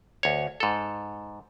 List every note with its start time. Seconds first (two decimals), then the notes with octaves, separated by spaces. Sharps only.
0.23 D2 C#5
0.60 G#2 A4